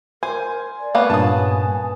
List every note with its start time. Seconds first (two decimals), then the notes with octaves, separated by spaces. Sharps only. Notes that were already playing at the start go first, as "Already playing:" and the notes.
0.23 A#4 C5 G#5
0.79 D5
0.95 A#3 B3 C#4 F5
1.10 G2 A#2 G#5 A5 D#6